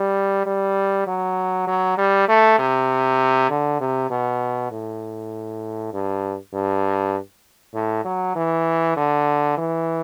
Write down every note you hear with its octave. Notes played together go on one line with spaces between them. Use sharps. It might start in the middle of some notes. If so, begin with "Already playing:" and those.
Already playing: G3
G3
F#3
F#3
G3
A3
C3
D3
C3
B2
A2
G2
G2
A2
F#3
E3
D3
E3